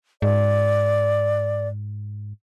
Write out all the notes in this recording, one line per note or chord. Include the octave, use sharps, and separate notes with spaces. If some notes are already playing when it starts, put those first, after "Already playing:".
G#2 D5